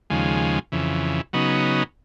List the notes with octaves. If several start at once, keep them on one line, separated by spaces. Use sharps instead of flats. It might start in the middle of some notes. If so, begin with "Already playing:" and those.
D#2 C#3 F3 G#3
F2 C#3 E3
C#3 F#3 B3 D#4